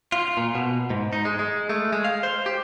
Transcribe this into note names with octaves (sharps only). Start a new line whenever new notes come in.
F4
A#2
B2
G#2
D#4
G#3
G#3
A3
G#3
F5
C5
G4